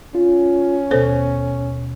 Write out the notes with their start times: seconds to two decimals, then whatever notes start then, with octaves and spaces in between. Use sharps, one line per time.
0.15 C#4 F4
0.91 D#2 B2 B3 A4 C5